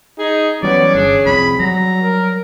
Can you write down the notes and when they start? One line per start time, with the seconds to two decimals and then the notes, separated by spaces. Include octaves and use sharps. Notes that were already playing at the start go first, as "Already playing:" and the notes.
0.19 D#4 G#4
0.63 E3 F#3 G3 B3 C#4 D5
0.95 G1 D4 G#4
1.26 C2 F2 B5
1.60 F#3 G3 F#4 A#5
2.02 A#4